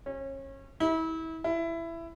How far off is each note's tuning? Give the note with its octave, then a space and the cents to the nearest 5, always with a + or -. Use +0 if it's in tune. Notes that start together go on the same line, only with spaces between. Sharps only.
C#4 -30
E4 -30
E4 +15